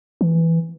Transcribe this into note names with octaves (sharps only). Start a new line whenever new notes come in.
E3